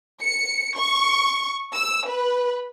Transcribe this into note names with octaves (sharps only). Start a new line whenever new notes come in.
C#7
C#6
E6
B4